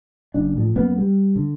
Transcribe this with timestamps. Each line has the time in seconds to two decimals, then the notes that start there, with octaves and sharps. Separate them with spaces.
0.34 F#1 D4
0.56 A2 F3
0.76 F#2 A#3 B3
0.98 G3
1.36 D3